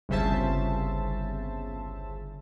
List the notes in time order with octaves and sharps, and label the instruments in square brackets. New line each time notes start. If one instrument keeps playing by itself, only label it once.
[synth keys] G1 C2 C#3 C5 E5 A5